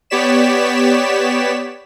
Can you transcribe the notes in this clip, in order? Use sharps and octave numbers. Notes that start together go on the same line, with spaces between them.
B3 G4 C#5 D5 B6 E7